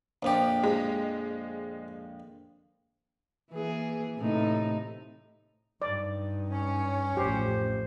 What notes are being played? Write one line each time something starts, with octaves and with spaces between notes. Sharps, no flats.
A#1 F2 G4
G#3
E3 A#3 G#4
A2 C3 D#4
G2 D#4 D5
C#4
A1 F2 G4 C5